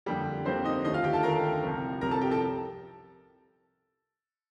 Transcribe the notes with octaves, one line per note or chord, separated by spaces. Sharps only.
F2 D3 G3 A#3 G4
F2 D3 G3 A#3 C4 C5
D#4 D#5
D#2 D3 A3 D#4 D#5
F4 F5
G4 G5
A4 A5
D#2 D3 A3 A#4 A#5
C2 C3 F3
C2 C3 F3 A#4 A#5
A4 A5
G4 G5
A4 A5